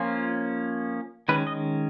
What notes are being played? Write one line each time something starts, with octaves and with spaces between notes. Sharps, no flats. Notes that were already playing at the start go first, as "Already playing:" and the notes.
Already playing: F3 A#3 C#4 F4
D#3 G#3 C#4 B4
D#5